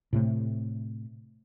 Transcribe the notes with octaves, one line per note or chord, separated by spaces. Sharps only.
A2 C3 A3